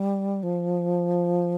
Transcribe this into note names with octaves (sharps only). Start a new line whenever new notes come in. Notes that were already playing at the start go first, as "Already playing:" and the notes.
Already playing: G3
F3